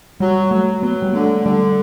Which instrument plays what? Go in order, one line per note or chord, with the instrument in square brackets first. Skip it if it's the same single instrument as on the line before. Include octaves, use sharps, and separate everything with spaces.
[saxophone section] F#3 [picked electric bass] G3
[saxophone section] F#3 [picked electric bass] A3
[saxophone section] F#3 [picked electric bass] B3
[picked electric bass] G3
[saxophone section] D3 [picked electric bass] A3
[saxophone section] D3 [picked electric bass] G3